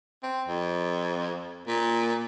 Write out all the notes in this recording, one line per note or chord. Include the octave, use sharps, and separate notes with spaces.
C4
F2
A#2